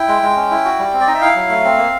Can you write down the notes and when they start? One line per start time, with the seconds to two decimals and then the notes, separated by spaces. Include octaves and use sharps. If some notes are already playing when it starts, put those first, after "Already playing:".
Already playing: E4 G5
0.08 G#3
0.22 G#3
0.36 C#4
0.51 E4
0.65 F#4
0.79 G3
0.93 C4
1.01 D5
1.07 D#4 D#5
1.14 E5
1.21 E4 F5
1.35 F#3
1.49 A3
1.65 C4
1.78 A#3